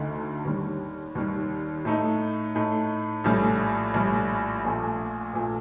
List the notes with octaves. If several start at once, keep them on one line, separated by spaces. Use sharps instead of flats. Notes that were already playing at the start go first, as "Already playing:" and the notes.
Already playing: D2 D3 A3 D#4
D#2 D#3 G3
D#2 D#3 G3
A2 A3 D#4
A2 A3 D#4
A#1 A2 G3
A#1 A2 G3
A#1 A#2 A3
A#1 A#2 A3